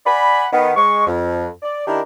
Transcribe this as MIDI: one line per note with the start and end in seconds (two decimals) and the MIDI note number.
0.06 0.46 74
0.06 0.46 78
0.06 0.46 80
0.06 0.46 83
0.53 0.71 51
0.53 0.71 59
0.76 1.07 56
0.76 1.07 85
1.07 1.48 41
1.62 1.84 74
1.87 2.01 51
1.87 2.01 62
1.87 2.01 64
1.87 2.01 67
1.87 2.01 70